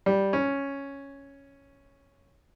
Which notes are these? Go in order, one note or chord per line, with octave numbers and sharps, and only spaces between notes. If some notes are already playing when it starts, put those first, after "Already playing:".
G3
C#4